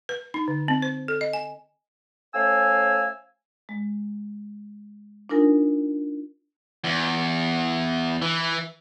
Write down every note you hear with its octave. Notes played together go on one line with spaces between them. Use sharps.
B4
D#4
D3
C4
C5
A4
D#5
G#5
A3 C#4 C5 F5 G#5 E6
G#3
D4 D#4 F4 A#4 G#5
E2
E3